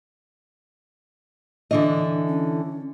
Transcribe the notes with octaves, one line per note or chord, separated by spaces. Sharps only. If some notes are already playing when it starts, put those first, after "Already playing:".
D3 E3 D4 D#5
C#4